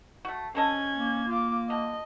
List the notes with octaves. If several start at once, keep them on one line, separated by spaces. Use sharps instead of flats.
A3 F#4
C4 C#4 A4 D#5 G#6
A#3
F4 D6
D3 D#5